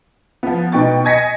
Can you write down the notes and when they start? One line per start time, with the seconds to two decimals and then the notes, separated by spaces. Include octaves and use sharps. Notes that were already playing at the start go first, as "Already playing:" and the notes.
0.43 F3 B3
0.72 B2 D#4 B4 G5 C#6 A6
1.04 D#5 G#5 G#6 A#6 B6 C#7